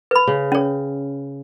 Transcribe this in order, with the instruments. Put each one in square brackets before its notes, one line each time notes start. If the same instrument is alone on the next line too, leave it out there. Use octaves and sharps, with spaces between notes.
[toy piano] B4 B5
[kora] C#3
[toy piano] C#4 C#5